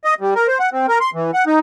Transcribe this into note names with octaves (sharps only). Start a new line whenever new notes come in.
D#5
G3
A#4
C5
F#5
C4
A#4
C6
E3
F#5
D#4